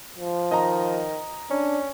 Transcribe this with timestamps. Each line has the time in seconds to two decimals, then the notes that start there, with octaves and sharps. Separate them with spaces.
0.17 F3
0.51 D#3 D#5 A#5
1.50 C#4 D4